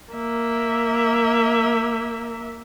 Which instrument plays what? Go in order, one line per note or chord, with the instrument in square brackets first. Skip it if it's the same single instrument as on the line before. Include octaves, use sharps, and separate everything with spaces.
[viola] A#3 E5